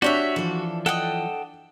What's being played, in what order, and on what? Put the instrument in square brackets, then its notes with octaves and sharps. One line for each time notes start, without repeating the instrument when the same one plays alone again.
[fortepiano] D4 [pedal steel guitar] F#4 [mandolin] G4 C#5 E5
[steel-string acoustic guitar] E3 F3 [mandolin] A4
[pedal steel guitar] A4 G5 F#6 [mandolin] D#5 F#5